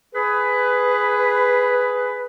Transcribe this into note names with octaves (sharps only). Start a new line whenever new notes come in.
G#4 B4